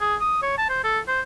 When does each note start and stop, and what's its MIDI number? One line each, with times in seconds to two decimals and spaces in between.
0.01 0.15 68
0.21 0.40 87
0.42 0.53 73
0.58 0.68 81
0.69 0.81 72
0.84 0.99 69
1.07 1.21 72